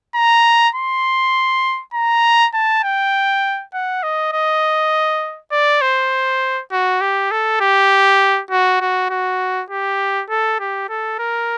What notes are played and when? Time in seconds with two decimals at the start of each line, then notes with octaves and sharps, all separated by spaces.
0.15 A#5
0.75 C6
1.94 A#5
2.54 A5
2.84 G5
3.74 F#5
4.03 D#5
4.33 D#5
5.52 D5
5.82 C5
6.72 F#4
7.01 G4
7.31 A4
7.61 G4
8.51 F#4
8.81 F#4
9.10 F#4
9.70 G4
10.30 A4
10.60 G4
10.89 A4
11.20 A#4